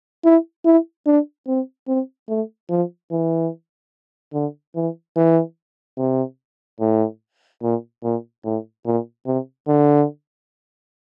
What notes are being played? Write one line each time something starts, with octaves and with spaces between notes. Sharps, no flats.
E4
E4
D4
C4
C4
A3
F3
E3
D3
E3
E3
C3
A2
A#2
A#2
A2
A#2
C3
D3